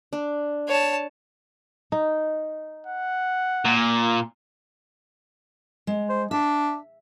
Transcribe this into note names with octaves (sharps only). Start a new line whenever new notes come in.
D4
C#5 A5
D#4
F#5
A#2
G#3
C5
D4 E5